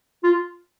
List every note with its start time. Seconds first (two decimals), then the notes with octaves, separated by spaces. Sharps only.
0.24 F4